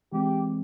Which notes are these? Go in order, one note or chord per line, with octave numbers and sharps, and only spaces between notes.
E3 G#3 C4 G4